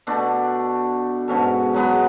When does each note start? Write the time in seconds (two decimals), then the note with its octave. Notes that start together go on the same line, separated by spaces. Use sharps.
0.07 B2 A3 D4
1.28 G#2 B2 C#4 A4
1.74 F#3 G#3 B3